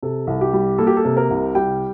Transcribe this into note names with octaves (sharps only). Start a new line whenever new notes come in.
C3 A4
C2
G4
G3
A#3 A4
G4
A4
C3
A#4
C2
G3 G5